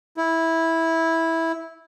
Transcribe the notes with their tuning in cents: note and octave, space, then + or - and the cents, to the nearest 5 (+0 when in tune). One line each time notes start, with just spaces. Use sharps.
E4 -10